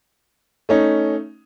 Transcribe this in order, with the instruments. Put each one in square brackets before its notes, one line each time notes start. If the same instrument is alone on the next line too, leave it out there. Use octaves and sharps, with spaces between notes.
[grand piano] A3 C#4 D#4